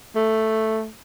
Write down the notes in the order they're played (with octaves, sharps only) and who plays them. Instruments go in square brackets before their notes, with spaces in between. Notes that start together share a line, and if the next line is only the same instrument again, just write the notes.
[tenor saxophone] A3